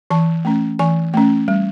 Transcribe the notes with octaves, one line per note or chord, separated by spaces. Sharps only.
E3 A5
A3 C#4
E3 G#5
A3 C#4
G3